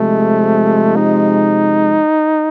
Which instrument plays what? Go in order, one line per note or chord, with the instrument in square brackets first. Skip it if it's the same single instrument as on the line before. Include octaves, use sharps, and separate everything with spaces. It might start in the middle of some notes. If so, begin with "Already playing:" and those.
Already playing: [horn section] C3 F3 G#3 [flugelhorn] A3
[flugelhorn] D#4